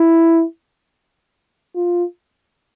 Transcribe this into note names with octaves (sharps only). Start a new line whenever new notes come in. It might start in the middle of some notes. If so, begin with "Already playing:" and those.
Already playing: E4
F4